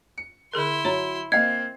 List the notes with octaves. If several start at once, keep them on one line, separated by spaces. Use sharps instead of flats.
C#7
D3 E4 G#4 A#4 C6
F#3 C#5 A#5
A#3 C4 D#5 F5 G#6 C7